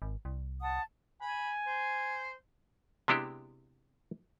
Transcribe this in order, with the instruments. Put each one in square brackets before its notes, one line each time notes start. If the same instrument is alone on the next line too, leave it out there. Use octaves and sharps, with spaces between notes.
[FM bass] G#1
C2
[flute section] F#5 A5 D#6
[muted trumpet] G#5 [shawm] B5
[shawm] C5
[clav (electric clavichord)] C3 G#3 B3 D4 E4 G4